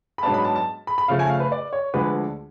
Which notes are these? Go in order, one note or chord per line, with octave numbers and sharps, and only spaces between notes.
B5
G#2 F#3 B3 D4 A5
B5
A5
A5
B5
B5
C#3 F3 A3 C#4 F5
G#5
F5
B4
D5
C#5
D2 D3 F3 G#3 B4